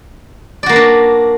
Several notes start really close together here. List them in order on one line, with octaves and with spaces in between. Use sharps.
D5 F#4 A#3 B4 D4